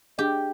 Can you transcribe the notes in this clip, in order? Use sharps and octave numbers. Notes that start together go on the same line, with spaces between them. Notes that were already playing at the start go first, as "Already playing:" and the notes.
D4 G4 G#4 D#5